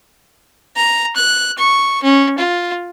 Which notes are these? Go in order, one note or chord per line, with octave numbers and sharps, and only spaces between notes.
A#5
F#6
C#6
C#4
F4